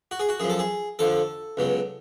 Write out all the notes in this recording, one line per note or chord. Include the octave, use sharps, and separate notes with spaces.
F#4
G#4
F#4
F#2 F3 G#4
A4
G#4
F2 D3 F3 A4
C#2 B2 F#3